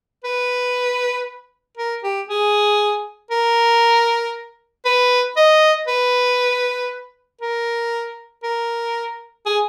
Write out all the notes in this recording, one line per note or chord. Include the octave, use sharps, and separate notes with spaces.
B4
A#4
G4
G#4
A#4
B4
D#5
B4
A#4
A#4
G#4